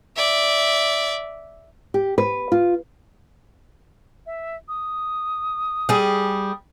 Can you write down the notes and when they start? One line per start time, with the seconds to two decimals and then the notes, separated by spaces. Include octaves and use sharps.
0.16 D5 E5
1.94 G4
2.18 B4
2.52 F4
4.26 E5
4.68 D#6
5.89 G3 G#4